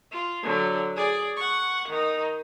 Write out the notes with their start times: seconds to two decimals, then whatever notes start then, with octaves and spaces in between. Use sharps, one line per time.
0.12 F4
0.43 D3 F#3
0.96 G#4 D5
1.37 F#5 C#6
1.89 D#3 D#4